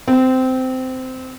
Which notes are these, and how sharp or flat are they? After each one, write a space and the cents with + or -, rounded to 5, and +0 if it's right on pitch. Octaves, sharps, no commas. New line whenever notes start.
C4 -15